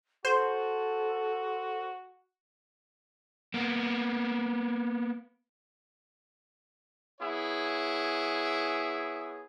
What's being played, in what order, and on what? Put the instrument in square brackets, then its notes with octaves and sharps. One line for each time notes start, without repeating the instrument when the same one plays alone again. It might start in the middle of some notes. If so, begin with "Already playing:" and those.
[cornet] F#4 [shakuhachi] A4 [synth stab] C5
[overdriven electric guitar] A#3 B3
[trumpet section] B3 E4 G#4 C#5